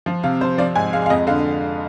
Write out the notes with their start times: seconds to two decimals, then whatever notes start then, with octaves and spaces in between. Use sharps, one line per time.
0.06 F3
0.23 C3 F5
0.41 F3 C5
0.58 F3 D5
0.75 G#2 G#5
0.93 G#3 F5
1.06 F5
1.10 F2 D#5
1.27 D3 F5